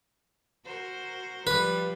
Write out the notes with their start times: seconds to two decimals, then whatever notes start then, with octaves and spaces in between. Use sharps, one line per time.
0.65 F#4 A#4 C5
1.47 F3 G3 F4 B4